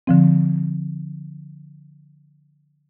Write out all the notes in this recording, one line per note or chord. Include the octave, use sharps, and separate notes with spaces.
D3 F3 C4